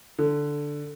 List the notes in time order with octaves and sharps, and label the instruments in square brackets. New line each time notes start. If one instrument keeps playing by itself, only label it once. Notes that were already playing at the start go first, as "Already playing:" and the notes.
[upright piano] D3